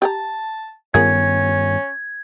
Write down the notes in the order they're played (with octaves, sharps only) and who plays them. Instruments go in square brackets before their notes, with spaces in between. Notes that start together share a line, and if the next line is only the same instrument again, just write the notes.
[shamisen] G4 G5 A#5 [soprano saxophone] A5
[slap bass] G2 D#3 B3 [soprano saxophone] C#4 [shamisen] F4 G#4 A#4 [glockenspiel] G#6